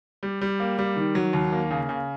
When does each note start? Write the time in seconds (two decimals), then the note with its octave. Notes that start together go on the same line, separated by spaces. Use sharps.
0.23 G3
0.41 G3
0.60 A#3
0.79 G3
0.96 D#3
1.15 F#3
1.33 D#2
1.52 A#3
1.71 C#3
1.89 C#3